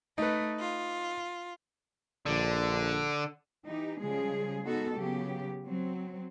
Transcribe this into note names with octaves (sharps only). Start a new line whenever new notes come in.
A3 D#4 B4
F4
A#1 D3
E3 D#4 G4
C#3 F3 G3 G#3 G#4
G#3 B3 D#4 F#4 A4
C#3 F#3 B3 G4
F#3 C4